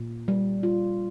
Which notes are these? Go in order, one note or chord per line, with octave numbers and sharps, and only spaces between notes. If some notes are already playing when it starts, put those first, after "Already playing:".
Already playing: A#2
G3
F4